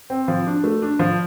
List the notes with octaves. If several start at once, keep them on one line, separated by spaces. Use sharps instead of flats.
C4
F3
D4
A3
D4
F3